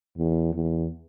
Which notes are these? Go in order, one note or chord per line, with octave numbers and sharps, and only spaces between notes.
E2
E2